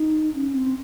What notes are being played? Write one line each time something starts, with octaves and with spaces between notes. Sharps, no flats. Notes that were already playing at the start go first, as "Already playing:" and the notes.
Already playing: D#4
C#4
C4